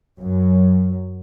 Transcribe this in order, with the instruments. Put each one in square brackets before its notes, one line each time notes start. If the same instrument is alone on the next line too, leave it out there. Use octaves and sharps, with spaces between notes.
[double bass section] F#2 F#3